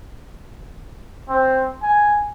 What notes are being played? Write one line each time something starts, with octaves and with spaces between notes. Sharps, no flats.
C4
G#5